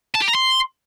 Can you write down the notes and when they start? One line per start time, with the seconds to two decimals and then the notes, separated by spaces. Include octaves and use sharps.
0.15 A5
0.22 G4
0.28 A#5
0.35 C6